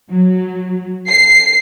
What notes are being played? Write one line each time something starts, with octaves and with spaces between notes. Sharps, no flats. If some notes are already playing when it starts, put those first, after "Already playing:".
F#3
C7